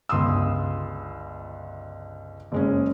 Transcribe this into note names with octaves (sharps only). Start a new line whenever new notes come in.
G1 C#2 C6 D#6 E6
F#1 G#3 C#4